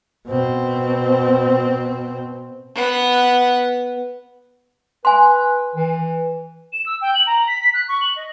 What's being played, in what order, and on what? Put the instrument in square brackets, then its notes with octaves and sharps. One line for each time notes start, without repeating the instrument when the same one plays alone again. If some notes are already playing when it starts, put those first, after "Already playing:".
[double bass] B2 C4
[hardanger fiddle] B3 F#5
[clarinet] B4 [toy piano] G#5 C6
[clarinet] E3
[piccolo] E7
E6
G5
F#7
A#5
B6
B6
F#6
C#6
F#7
D#5